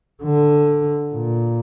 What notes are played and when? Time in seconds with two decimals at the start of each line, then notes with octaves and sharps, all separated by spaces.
0.23 D3
1.14 A#2